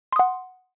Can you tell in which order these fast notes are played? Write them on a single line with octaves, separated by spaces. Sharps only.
C6 D#6 F#5